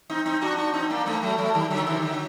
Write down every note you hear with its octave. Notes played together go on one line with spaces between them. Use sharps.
C4 D#4
C4 D#4
D4 F#4
D4 F#4
C4 D#4
A#3 D4
A3 C4
F#3 A3
F#3 A3
D#3 G3
D3 F#3
C3 D#3
D3 F#3